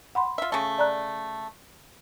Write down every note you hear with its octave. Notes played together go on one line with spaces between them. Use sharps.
F#5 B5 C6
F4 E5
C#3 A3
D5 A#5 F#6